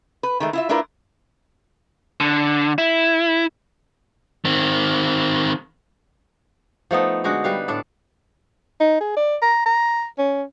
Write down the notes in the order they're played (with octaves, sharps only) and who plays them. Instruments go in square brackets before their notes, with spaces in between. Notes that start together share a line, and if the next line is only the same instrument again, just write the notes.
[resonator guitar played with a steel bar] B4
D#3 G#3 A3
E4 F4 E5
A3 D4 E4 F4 A#4 B4
[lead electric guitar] D3
E4
D#3 C4
[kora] F3 A3 B3 D#4
D3 G#3 D#4 F#4
G3 B4 F5
A2 D4 A4
[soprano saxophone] D#4
G#4
D5
A#5
A#5
C#4